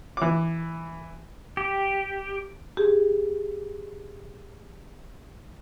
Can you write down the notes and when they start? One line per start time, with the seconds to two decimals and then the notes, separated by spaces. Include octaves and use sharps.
0.17 E3 D6
1.57 G4
2.77 G4 G#4